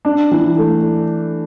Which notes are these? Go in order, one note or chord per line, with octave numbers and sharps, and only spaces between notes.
D4
E3
A3